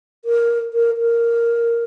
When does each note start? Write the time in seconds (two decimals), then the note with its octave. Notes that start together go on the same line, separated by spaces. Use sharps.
0.25 A#4
0.74 A#4
0.98 A#4